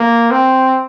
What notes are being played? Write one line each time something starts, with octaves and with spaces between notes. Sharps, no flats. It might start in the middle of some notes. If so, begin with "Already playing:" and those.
Already playing: A#3
C4